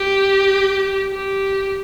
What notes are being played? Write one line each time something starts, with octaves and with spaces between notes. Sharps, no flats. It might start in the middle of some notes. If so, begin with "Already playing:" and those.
Already playing: G4
G4